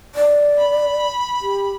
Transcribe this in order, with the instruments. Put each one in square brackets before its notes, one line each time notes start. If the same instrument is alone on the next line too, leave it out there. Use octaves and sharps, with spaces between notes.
[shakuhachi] D5
[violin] B5
[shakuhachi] G4